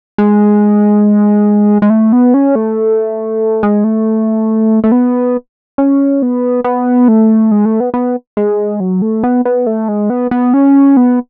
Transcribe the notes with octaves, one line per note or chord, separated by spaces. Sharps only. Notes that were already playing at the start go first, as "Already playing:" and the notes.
G#3
G#3
A3
B3
C#4
A3
G#3
A3
A3
B3
C#4
B3
B3
A3
G#3
A3
B3
B3
G#3
F#3
A3
B3
B3
A3
G#3
B3
B3
C#4
B3